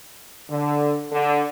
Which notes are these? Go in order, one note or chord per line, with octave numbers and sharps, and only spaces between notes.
D3
D3